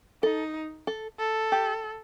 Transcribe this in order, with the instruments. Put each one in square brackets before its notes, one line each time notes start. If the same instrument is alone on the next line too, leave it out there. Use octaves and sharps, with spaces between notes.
[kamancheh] D#4 [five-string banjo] A4
[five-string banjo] A4
[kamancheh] A4
[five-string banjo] G4